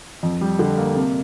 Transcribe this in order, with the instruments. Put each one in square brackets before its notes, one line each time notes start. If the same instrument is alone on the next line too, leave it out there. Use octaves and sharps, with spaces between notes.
[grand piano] F2
G3
D3
A#3
C3